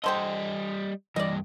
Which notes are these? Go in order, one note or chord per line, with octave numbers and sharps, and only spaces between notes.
D3 G3 C5 D#5 G5
G2 E3 D5 D#5